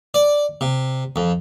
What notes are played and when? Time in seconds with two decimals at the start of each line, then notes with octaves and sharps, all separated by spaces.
0.14 D5
0.61 C3
1.16 F2